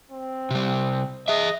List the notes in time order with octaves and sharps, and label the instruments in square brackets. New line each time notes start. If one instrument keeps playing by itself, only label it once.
[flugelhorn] C4
[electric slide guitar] C3 G3
[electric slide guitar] G#4 E5 [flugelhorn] D#5